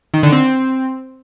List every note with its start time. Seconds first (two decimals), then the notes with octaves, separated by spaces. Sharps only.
0.14 D#3
0.23 D3
0.32 C4